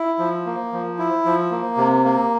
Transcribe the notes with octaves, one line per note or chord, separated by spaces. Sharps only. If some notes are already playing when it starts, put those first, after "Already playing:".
Already playing: E4
F3
A#3
F3
E4
F3
A#3
C3
A#3